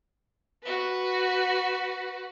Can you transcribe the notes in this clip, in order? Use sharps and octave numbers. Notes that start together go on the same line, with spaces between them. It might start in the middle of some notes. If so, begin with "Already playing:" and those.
F#4 B4